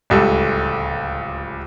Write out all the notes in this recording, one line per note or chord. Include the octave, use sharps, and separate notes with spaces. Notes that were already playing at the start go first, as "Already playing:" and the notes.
D1 C#2 G3 A4